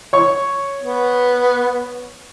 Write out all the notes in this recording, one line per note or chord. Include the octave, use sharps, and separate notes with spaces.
C#5 C#6
B3